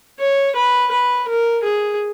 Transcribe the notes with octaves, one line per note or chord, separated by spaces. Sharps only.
C#5
B4
B4
A#4
G#4